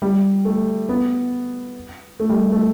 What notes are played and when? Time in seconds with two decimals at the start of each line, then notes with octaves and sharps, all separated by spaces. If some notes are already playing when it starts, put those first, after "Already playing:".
0.02 G3
0.45 A3
0.89 B3
2.19 A3
2.29 G3
2.52 A3